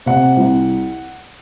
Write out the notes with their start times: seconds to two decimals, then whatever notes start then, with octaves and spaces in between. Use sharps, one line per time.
0.06 C3 F#5
0.37 C2